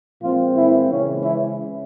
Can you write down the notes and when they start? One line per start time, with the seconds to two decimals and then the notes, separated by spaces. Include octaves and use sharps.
0.22 A#2 F3 G#3 C4 F4
0.56 E3 E4
0.90 C#3 E3 G#3 C#4
1.24 E3 E4